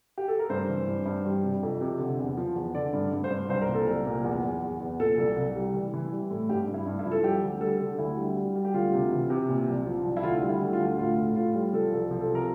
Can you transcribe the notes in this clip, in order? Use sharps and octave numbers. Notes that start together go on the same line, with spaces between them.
G4
A4
A#4
G2 C5
E3
G2
G2
G3
C3
F2
C3
D3
E2
F3
E2
D3 D5
G2
G2
C5
G2
C2 C5
A#4
A#2
A4
C2 A#4
A#2
E2
E2
E2
E2
A#2 A4
C2
C2
G3
E3
E3
G3
A2
G2 G4
G2
E4
G2
E4
F3
A4
G3 G4
D2
G3 A4
D3
D2 E4
G3
G3
G3
G4
D2 F4
C3
E3
C3
A#2
C2
F3
C2
E4
D2 F4
G3
E4
D2
F4
D2
A2 F4
A2
A2 F4
G3
F3 A4
C2
F3
A4
C3 A#4